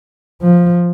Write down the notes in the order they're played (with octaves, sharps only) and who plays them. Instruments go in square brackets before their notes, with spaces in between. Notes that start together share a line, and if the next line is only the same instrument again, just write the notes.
[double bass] F3